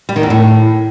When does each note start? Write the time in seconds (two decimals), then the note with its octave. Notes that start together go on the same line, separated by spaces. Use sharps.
0.09 G3
0.16 D#3
0.23 E2
0.30 A2